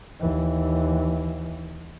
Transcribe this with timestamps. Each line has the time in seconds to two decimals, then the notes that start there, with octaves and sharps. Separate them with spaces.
0.20 D#2 E3